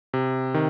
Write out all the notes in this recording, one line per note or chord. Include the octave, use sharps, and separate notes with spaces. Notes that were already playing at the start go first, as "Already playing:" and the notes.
C3
D#3